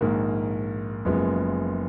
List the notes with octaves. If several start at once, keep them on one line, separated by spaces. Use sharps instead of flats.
A#1 G#2 D#3 A#3
F#1 F#2 F3 G#3 B3